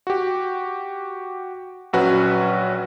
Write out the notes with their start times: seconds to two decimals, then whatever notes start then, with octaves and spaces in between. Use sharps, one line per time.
0.07 F#4 G4
1.93 A#1 F#3 C#4 F#4 B4 F#6